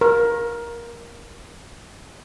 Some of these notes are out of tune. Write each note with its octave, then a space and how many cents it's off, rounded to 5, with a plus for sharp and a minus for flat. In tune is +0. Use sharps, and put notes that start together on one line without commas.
A#4 +15